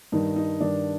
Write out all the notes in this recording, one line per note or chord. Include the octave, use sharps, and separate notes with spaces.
G2 D#3 D#4
D#4
G2 D#3 D4